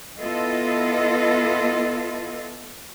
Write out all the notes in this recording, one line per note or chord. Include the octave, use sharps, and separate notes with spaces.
B3 E4 F4 A4 D#5